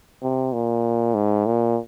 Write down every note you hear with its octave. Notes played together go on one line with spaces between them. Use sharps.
C3
A#2
G#2
A#2